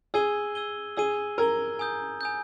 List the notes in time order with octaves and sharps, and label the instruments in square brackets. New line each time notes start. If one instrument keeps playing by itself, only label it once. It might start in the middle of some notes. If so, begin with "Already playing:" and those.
[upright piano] G#4 [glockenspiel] E6 G#6 D#7 G7
[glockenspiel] E6 G#6 D#7 G7
[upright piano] G#4 [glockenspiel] E6 G#6 D#7 G7
[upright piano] A#4 [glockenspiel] E6 G#6 D#7 G7
[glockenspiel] G#5 D#6 G6
G#5 D#6 G6